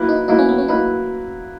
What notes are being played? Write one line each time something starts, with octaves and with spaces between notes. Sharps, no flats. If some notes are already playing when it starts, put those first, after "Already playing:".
Already playing: F#3 A#3 E4 B4
D#4
F#3 A#3 D#4 E4 B4
C#4
B3
C#4
F#3 A#3 D#4 E4 B4